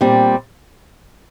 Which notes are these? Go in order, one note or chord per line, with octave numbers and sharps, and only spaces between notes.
A#2 G3 C4